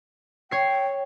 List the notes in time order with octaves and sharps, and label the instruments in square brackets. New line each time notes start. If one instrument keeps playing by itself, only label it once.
[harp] C#5 C7 [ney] G5